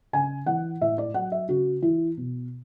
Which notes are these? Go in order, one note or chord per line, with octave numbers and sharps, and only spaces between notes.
C#3 G#5
E3 F#5
A2 E5
D5
F#3 F#5
E5
C#3 F#4
E3 E4
B2